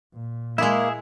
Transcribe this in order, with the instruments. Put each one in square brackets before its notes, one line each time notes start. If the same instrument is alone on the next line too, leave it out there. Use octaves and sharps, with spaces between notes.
[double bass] A#2
[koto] G#3 E4 [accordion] A#3 [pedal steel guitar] G#4 E5